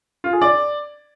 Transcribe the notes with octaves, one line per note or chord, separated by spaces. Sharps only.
F4
G#4
D5